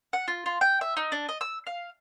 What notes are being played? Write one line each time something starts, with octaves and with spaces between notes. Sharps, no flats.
F#5
F4
F4
G5
E5
D#4
D4
D#5
E6
F5